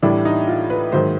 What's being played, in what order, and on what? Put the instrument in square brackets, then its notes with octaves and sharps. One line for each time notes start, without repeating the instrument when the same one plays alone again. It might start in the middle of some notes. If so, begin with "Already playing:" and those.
[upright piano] A2 E3 G3 D4
D#4
F4
B4
G#2 D#3 F#3 C5